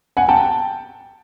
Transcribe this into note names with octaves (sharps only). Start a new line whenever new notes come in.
F#5 G#5
G5 A5